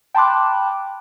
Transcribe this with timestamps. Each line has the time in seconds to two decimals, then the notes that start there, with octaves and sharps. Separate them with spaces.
0.15 G5 A5 B5 C6 D6 F#6